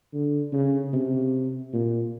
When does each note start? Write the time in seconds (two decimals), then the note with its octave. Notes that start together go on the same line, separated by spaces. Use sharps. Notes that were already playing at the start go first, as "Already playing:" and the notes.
0.13 D3
0.53 C#3
0.93 C3
1.73 A#2